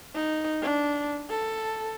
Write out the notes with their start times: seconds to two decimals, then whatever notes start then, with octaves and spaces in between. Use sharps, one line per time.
0.15 D#4
0.62 D4
1.30 A4